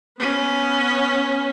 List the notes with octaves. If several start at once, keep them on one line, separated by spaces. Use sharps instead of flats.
B3 C#4